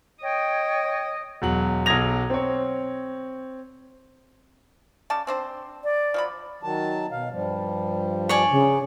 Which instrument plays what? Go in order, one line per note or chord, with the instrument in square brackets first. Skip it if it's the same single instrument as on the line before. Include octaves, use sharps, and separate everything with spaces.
[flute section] C#5 G5 [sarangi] D#5
[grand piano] E1 F#3 F#7
B1 F#3 D#6 G#6 A#6 F7
C4 C#5
[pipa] C#3 D5 A5
C4 D4 C5
[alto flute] D5
[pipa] F3 F#3 B5
[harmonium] D#3 F#3 A5
B2 F5
G2 F3 G3
[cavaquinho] C#5 D5 G#5
[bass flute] C#3